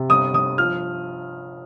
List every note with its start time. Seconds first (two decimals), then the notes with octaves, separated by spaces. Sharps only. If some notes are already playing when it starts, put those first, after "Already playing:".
Already playing: C3
0.09 G1 D#6
0.33 G1 D#6
0.58 F3 F6